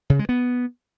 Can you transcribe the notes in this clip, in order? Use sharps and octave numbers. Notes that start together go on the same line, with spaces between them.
C#3
G#3
B3